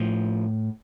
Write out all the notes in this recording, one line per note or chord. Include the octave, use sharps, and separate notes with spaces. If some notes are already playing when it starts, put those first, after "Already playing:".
Already playing: A2 F3